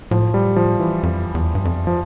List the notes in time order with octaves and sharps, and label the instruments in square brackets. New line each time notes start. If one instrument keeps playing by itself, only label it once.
[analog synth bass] A2 [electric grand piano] F3
[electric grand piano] G3
F3
E3
[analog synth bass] F2
E2
G2
F2
[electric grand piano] F3